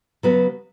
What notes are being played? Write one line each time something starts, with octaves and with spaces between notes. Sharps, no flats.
C#3 F#3 B3 F#4 B4